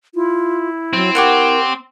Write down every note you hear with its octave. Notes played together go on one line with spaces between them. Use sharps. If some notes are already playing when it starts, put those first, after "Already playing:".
E4 F4
F#3 C4
G4 A#4 C#5 F#5